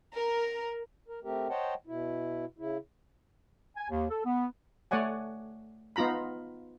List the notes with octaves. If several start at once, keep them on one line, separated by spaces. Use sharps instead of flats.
A#4
A#4
A3 C4 G4 A#4
C5 C#5 D#5 F#5 G5 A5
B2 E4
C#3 E4
G#5
D#2
A4
B3
A3 C#5 D5 F#5 G#5
B3 D#4 F4 A#5 B5